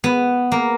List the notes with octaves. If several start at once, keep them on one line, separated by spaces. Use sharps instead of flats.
B3
A#3